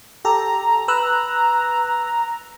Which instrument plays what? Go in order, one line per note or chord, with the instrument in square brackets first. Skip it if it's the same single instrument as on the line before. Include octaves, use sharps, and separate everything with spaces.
[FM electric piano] G4 A4 [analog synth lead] A#5
[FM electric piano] B4 E6 F#6